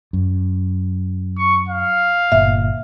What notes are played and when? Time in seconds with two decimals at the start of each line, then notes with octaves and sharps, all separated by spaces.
0.13 F#2
1.38 C#6
1.68 F5
2.32 G1 A#2 E5